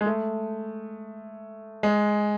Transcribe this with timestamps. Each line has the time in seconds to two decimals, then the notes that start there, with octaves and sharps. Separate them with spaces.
0.01 G#3
0.06 A3
1.83 G#3